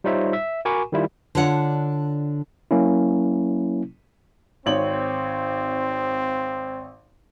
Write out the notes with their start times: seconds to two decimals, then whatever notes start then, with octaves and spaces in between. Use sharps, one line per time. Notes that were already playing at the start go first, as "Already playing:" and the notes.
0.04 G3 D#4 F4 C5 C#5 E5
0.33 E5
0.65 F#4 A#4 G#5 B5 C#6 D6
0.92 D#3 G3 E4 F4
1.35 D3 D4 F4 C#5 F#5
2.71 F#3 A#3 C#4 E4
4.66 G#1 C4 C#5 F#7